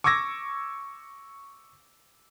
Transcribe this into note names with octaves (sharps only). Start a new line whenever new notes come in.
C#6 D6 E6 G#6 A#6